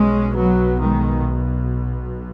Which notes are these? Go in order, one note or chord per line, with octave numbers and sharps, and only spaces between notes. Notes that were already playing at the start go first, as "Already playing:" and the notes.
Already playing: B1 B2 G#3 C#4
F#3 B3
D#3 G#3